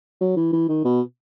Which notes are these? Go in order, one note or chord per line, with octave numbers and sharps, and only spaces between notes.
F#3
E3
E3
D#3
B2